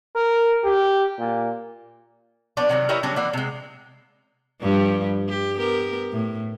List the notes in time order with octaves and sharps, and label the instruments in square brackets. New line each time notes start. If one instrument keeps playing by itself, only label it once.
[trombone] A#4
G4
A#2
[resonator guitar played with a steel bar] F3 B3 D4 C#5 D5
C3 D#3 F#3
E4 G4 A#4 C#5 D#5 E5
C#3 F#3 G3 C#4 D4
E3 A#3 D5 F#5
C3 G#3
[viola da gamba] G2 F3 G3
G4
B3 G4 A#4
A2